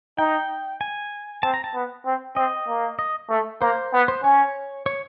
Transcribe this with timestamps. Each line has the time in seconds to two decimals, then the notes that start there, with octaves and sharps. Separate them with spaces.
0.18 D#4 G5
0.81 G#5
1.43 C4 A5
1.54 A#5
1.64 A5
1.74 B3
2.05 C4
2.36 C4 D#5
2.68 A#3
2.99 D#5
3.30 A3
3.62 A#3 C5
3.93 B3
4.08 C5
4.24 C#4 C#5
4.86 C#5